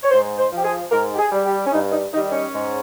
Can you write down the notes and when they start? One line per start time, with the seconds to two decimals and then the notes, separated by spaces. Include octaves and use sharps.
0.04 C#5
0.11 G#2 C5
0.38 C5
0.51 F3
0.58 G4
0.64 G#4
0.91 G#2 A#4
1.14 G4
1.18 G#4
1.31 G3
1.46 G4
1.66 C#4
1.72 G2 D#4
1.92 D#4
2.13 D#3 D#4
2.17 G3
2.32 C#4
2.54 G#2